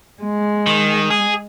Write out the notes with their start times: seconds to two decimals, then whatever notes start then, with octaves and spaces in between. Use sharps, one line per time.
0.23 G#3
0.66 D#3
1.10 G#4